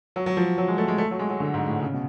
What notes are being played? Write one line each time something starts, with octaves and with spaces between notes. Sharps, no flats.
F#3
F#3
F3
F#3
G#3
A3
G#3
A3
F#3
G#3
F#3
D3
G#2
A2
C#3
B2